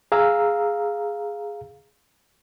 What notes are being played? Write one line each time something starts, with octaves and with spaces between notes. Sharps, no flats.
G#4 F5 A#5 E6